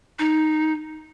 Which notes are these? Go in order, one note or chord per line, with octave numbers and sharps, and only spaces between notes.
D#4